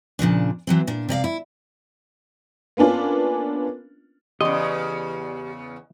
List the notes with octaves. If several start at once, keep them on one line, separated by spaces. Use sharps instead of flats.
A#2 C#3 F3 D4
E3 F#3 C4
A#2 D4
C3 D5 D#5 F5
E4
A#3 B3 C#4 D4 F4
E2 C#3 G4 D5 D#5 C6